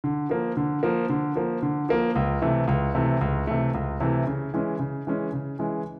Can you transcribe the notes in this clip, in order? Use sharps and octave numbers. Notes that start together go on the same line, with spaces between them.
D3
F3 A#3
D3
F3 A#3
D3
F3 A#3
D3
F3 A#3
C#2
C3 E3 A3
C#2
C3 E3 A3
C#2
C3 E3 A3
C#2
C3 E3 A3
C#3
E3 G#3 C#4
C#3
E3 G#3 C#4
C#3
E3 G#3 C#4